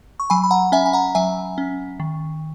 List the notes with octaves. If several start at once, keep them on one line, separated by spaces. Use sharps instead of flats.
C#6
F#3 G#5 B5
B5
F#5 A#5
C#4 E5 G#5
G#5
F#5 A#5
F#3 E5 G#5
C#4
D#3